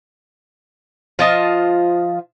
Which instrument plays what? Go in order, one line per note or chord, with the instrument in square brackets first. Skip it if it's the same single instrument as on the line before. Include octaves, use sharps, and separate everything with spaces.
[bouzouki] F3 F4 D#5 A5